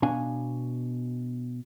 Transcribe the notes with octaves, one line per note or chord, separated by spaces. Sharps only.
B2 D4 F5 G#5